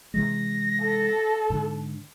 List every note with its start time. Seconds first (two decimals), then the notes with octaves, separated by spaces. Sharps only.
0.14 C3 E3 G#3 A#6
0.81 A4
1.50 G#2 D3